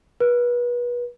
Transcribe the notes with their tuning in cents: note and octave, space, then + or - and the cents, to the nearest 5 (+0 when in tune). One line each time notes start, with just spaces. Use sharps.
B4 -30